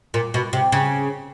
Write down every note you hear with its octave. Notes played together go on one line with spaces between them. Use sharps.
A#2
B2
C3
C#3